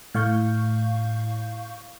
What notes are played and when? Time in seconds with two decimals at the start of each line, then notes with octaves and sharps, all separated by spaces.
0.14 A2 F5 C#6 G6